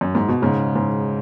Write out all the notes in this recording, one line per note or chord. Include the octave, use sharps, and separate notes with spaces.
F#2
G#2
B2
G#2 C#3
G#2